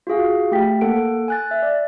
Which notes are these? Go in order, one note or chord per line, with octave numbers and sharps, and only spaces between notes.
F4 F#4 G#4 F5
A3 G4 G5 B6
A#3 A4 F#5 D7
G#5 F#6 A6
E5
D5